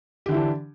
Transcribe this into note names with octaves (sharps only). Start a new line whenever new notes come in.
D3 E3 D4 E4 G4